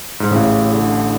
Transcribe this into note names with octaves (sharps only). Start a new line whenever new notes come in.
G#2
A1 A2 C#3
D3